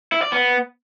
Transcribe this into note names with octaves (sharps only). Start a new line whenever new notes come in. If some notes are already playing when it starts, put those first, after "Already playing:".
E4
D5
B3